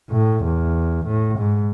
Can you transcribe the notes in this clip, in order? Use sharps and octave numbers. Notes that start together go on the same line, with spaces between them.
A2
E2
A2
G#2